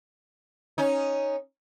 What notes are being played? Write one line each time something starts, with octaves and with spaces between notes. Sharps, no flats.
C#4 D#4